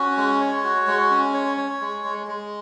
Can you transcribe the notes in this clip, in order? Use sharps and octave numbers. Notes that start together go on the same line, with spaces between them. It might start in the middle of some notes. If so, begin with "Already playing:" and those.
Already playing: C#4 F#4
G#3
C#5
F#4
G#3
C#4
C#5
C#5
G#3
G#3
G#3